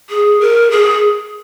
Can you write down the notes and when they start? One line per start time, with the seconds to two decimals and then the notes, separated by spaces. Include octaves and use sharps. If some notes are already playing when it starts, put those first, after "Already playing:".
0.10 G#4
0.41 A#4
0.71 G#4